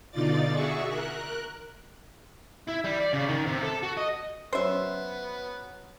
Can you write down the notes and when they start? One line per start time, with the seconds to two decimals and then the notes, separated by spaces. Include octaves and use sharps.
0.11 B2 D3 D#4 F4 D5 A6
0.52 F#4 G#4 E5 C#6
0.89 A#4 F#6
2.67 E4
2.84 G3
3.00 D5
3.13 C#3
3.28 D#3
3.46 C3
3.62 A4
3.83 F#4
3.97 D#5
4.53 F#3 B3 C#4 C5 E5